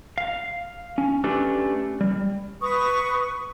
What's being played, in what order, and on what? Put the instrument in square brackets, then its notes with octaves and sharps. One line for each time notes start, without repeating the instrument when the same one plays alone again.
[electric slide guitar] F5
C#4
A3 C#4 D4 G4 B4
G3
[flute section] B4 C#6 D#6